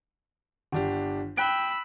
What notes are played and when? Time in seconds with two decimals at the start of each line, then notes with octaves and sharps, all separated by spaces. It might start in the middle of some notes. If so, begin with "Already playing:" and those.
0.72 G1 D4 G4
1.37 G5 B5 E6 F#6 D7